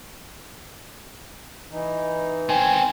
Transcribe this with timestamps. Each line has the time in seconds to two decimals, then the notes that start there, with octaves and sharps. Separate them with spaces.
1.71 E3 D#4
2.49 D#3 C4 G#5